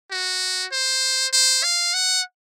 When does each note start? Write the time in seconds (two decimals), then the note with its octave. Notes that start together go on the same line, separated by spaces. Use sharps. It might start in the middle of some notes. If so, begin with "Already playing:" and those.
0.11 F#4
0.72 C5
1.33 C5
1.63 F5
1.94 F#5